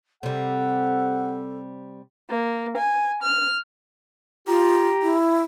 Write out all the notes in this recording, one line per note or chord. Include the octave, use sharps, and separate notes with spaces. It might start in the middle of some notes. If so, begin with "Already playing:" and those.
C3 G3 A4 F#5
A#3
G#5
F6
F4 G4 A#5
E4